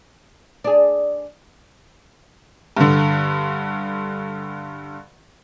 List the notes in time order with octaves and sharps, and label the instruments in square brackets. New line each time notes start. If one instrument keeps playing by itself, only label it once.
[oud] D4 G#4
[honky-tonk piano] G2 D3